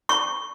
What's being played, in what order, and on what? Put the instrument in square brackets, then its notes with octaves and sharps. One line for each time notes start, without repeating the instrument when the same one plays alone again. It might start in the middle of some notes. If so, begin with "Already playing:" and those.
[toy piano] C#6